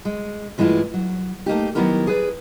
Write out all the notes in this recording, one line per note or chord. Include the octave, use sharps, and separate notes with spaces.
G#3
G2 E3 G#3 A3 E4 F4
F#3
A3 A#3 D#4 G4
D#3 F#3 B3 E4 G4 A#4
G#4 B4 D5